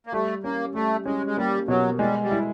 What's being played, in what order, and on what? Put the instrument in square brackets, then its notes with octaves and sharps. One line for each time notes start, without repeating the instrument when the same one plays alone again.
[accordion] A#3
[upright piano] G3 [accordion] A3
[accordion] A#3 [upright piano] C#4
[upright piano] G3 [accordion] A3
[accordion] G#3 [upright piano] C#4
[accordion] G#3
[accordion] G3 [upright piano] A#3
[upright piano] B2 [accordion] F#3
[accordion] G3 [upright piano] G#3
[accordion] G3
[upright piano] E4